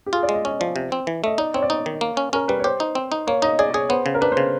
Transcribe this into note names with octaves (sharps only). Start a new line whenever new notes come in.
G4
F4 G#4
D5
G#3
D#5
C#4 D#5
F3 D5
C3
C4
E3
A3 D#5
D#4 D5
C4 C#5
D5
D#4 C#5
D#3
A#3
C#4
C#4 A#4
G3 B4
C#5
G4 C5
D#4
C4
D#4
A#3 C#5
D#4 D#5
G#4 D5
G#4 C#5
B3 C5
C#3
A#4
D4 B4
C5
C#3